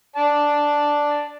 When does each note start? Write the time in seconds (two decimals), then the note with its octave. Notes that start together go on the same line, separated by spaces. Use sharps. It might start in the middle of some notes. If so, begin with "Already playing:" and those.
0.16 D5 A5